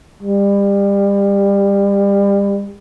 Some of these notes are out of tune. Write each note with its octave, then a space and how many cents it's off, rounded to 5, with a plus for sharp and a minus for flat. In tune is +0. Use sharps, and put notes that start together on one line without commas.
G3 +30